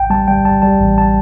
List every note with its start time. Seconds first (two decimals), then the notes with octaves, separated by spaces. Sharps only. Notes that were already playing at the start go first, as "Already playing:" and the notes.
Already playing: A1 G5
0.10 G3 A5
0.28 G3 G5
0.45 G3 A5
0.62 G3 A5
0.80 A1
0.98 A5